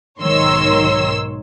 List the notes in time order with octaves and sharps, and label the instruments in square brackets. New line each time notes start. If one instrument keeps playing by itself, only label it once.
[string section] B1 G#2 D#3 C#5 C6 E6